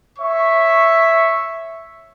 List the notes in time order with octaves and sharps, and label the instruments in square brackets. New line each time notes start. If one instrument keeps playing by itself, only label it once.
[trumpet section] C#5 E5 C#6